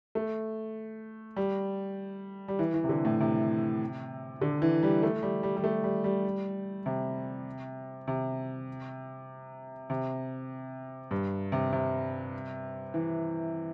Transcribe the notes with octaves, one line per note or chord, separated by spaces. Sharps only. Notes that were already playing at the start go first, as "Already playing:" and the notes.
A3
G3
G3
E3
E3
C3
D3
A2
C3
D3
E3
G3
A3
G3
G3
G3
A3
G3
G3
C3
C3
C3
G2
C3
C3
E3